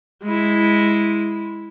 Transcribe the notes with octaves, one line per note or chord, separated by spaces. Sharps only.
G#3 E4